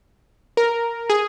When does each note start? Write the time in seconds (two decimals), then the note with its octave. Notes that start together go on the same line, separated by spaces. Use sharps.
0.57 A#4
1.10 G#4